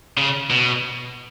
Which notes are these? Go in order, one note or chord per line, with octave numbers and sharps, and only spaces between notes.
C#3
B2